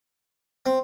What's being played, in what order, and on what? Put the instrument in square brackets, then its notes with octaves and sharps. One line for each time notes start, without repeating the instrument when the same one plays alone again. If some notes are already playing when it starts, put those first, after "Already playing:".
[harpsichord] C4